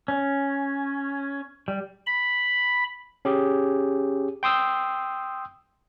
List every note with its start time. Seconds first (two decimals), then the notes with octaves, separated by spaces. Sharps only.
0.08 C#4
1.68 G3
2.06 B5
3.25 C#4 G4 G#4
4.43 G5 C6 D#6 E6